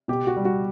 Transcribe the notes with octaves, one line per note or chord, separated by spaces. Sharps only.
B2 G4
F#4
G3
F#4